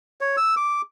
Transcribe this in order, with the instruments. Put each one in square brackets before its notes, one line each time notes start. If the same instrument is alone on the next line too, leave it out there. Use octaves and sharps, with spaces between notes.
[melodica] C#5
E6
D6